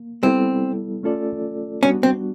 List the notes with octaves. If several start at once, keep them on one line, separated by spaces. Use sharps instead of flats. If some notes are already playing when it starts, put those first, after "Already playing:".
Already playing: A#3
G3 B3 C4 E4 A4
A3 C#4 F4 A4 D5
G3 B3 C#4 D4 F#4
C4